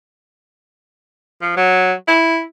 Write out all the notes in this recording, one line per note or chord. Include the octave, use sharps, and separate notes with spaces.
F3
F#3
E4